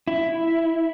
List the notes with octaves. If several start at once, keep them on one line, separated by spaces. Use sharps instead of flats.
E4